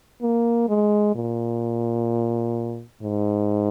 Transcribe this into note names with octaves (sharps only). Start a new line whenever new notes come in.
A#3
G#3
A#2
G#2